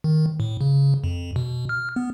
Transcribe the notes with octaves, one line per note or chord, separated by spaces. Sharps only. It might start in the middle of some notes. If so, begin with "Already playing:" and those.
D#3
A2
C#3
F2
B2
F6
B3